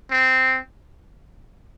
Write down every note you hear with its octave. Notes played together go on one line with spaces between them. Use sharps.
C4